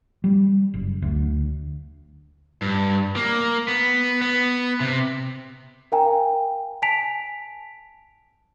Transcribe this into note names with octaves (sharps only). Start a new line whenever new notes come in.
G3
F#1
D2
G2
A#3
B3
B3
C3
A#4 F5 G5 G#5 A#5
G#5 A5 B6 D7 F7